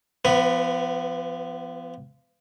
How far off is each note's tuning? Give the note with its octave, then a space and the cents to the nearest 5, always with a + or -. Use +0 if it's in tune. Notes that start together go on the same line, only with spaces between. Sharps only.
F3 -25 B3 +30 B4 +0